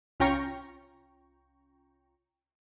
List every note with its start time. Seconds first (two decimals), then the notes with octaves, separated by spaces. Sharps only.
0.20 C2 C#4 F4 G5 A#5 C#6